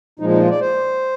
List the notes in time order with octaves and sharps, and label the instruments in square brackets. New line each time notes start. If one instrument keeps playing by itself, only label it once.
[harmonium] A#2 F3 G#3 D#4
D#4
F4
D5
C5